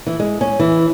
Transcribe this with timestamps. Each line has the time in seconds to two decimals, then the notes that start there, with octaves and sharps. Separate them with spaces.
0.07 E3
0.20 G#3
0.41 C#4
0.59 E3